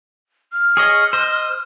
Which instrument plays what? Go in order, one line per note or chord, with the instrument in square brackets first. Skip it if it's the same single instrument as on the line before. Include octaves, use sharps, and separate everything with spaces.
[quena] F6
[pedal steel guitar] G#4 C#5 D#5
C5 D#5